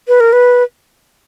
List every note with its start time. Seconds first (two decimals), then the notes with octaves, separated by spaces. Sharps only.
0.08 B4
0.20 A#4
0.33 B4